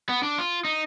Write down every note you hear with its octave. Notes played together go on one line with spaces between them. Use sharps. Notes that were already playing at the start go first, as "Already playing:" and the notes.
B3
D4
F4
D#4